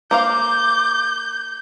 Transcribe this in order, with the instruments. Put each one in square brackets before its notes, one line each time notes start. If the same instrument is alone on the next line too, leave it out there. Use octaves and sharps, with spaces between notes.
[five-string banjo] A#3 C5 F5 [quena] D6 [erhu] G6